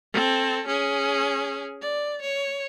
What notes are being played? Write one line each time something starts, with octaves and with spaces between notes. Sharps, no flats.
C4 A4
C#4 G#4
D5
C#5